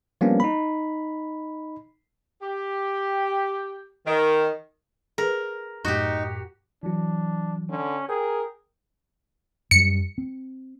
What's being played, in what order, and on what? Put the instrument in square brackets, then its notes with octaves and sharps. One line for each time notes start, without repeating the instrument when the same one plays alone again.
[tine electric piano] F3 G3 A#3 B3 C#4 D4
D#4 B5
[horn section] G4
D#3
[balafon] G#4 B4 [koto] A#4
[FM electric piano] F#2 A2 [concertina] D#4 [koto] F#4 G4
[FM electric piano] E3 F#3 [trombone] D4
[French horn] D3 [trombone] C#4
[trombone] G#4 [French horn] A#4 [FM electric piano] G5
[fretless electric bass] F#2 G3 [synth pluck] C#7
[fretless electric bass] C4